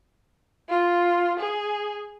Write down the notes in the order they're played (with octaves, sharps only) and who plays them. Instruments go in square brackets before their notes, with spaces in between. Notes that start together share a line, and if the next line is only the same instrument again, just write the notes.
[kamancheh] F4
G#4